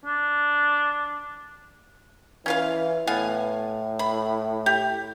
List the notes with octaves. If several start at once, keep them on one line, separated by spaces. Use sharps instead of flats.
D4
E3 C#4 F4 F5
A2 B3 F5 G#5
B5
G4